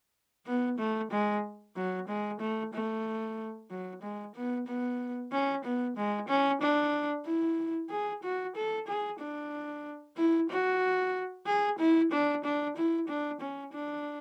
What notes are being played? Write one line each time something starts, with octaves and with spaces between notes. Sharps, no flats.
B3
A3
G#3
F#3
G#3
A3
A3
F#3
G#3
B3
B3
C#4
B3
G#3
C#4
D4
E4
G#4
F#4
A4
G#4
D4
E4
F#4
G#4
E4
D4
D4
E4
D4
C#4
D4